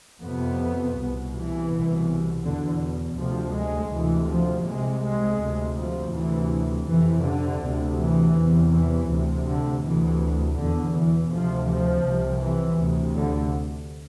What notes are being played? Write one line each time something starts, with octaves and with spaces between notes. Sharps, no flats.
F2 C3 B3
C2 B2
E3
C2 B2
E2 B2 D3
D2 C3 F3
G#3
D2 C3 E3
F3
C2 C3 G#3
G#3
D2 C3
F3
D2 C3 E3
F2 C3 E3
D3
D2 C3
E3
E2 C3
E3
D2 C3
D3
D2 C3 E3
B2 D3
E2
E3
D2 C3 F3
F3
C2 C3
E3
D2 C3
D3